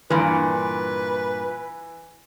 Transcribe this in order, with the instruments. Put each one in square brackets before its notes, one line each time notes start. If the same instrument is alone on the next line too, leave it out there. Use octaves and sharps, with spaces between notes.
[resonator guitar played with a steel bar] G2 A#2 [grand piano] E3 [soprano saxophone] B4